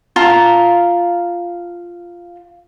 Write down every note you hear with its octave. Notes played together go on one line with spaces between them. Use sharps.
F4 F5 A5 A#5